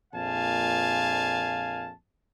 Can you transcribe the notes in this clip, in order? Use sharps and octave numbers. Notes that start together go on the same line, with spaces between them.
A#1 F2 A#2 F5 G#5 A5